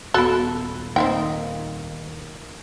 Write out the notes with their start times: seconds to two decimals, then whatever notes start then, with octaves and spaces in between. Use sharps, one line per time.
0.14 D#1 B3 F#4 A4
0.96 D#3 A#3 C4 D#4 E5 G5